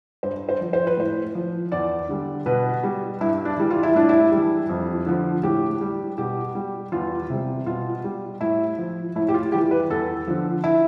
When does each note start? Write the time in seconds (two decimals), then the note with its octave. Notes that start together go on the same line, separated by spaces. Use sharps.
0.23 G2 C5
0.49 C5
0.61 F3
0.73 C5
0.87 B4
0.97 A2 C5
1.35 F3
1.72 E2 D5
2.09 D3 G3
2.46 B2 B4
2.83 G3
3.21 G2 E4
3.45 D4
3.58 E3 G3
3.70 F4
3.83 E4
3.95 A2 D4
4.09 E4
4.32 G3
4.37 E3
4.69 F2
5.06 D3 F3
5.43 A2 G4
5.81 G3
6.18 B2 G4
6.55 G3
6.92 E2 F4
7.30 C3 G3
7.66 B2 F4
8.04 G3
8.41 A2 E4
8.78 F3
9.15 A2 E4
9.28 G4
9.34 F4
9.52 E3 G3 G4
9.71 B4
9.90 E2 A4
10.27 D3 F3
10.64 E4